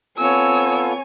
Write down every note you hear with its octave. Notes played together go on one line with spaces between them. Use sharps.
B3 C4 F4 A4 C#5 G#5 E6